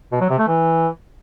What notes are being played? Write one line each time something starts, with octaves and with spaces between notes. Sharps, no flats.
B2
F#3
C3
A3
E3